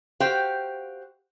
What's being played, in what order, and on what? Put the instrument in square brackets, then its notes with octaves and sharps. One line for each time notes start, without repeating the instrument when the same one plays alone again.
[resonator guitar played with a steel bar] F#4 G4 C5 F5 G5